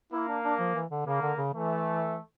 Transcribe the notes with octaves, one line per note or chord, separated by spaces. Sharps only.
A#3 E4
D4
D4
F3
E3
D3
C#3 A#3
D3
C#3
E3 A3